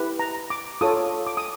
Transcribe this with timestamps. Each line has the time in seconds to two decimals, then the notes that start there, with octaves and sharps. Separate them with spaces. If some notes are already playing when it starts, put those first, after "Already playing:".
Already playing: E4 G4 B4
0.19 A#5
0.50 D6
0.81 F4 A4 C#5 D#6
1.27 D6
1.37 D#6